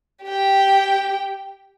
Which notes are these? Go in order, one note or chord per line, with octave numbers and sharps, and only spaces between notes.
G4 G5